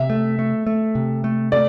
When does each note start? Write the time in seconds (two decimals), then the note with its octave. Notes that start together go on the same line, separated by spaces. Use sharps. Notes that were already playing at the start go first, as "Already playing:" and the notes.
Already playing: C3 E5
0.10 A3
0.39 A3
0.67 A3
0.95 C3
1.24 A3
1.52 A3 D5